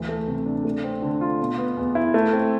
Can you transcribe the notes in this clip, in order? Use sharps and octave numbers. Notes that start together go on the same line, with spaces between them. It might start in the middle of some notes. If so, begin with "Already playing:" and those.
Already playing: D2 E3
A3
C3
D4
A3
C4
D3
F4
B2
B3
E2
E4
A3
C4